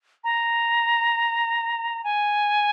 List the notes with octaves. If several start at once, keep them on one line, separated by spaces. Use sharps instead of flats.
A#5
G#5